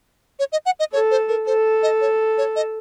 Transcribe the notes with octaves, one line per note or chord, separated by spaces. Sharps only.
C#5
D#5
F#5
D#5
A4 C#5
C5
A#4
A4 C5
D#5
C#5
C#5
D#5